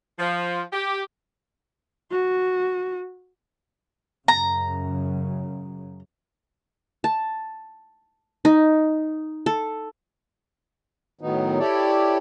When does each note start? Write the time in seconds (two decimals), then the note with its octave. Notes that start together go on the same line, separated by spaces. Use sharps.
0.19 F3
0.73 G4
2.11 F#4
4.28 F#2 C#3 A#5
7.04 A5
8.45 D#4
9.46 A4
11.21 A2 D#3 F#3 B3 D#4
11.59 E4 G4 A4 C#5 D5